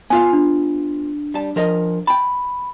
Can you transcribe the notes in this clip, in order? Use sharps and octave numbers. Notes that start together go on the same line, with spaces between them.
B3 F4 F5 G#5
D4
G3 A5
F3 A#4 D#5
G5 A5 B5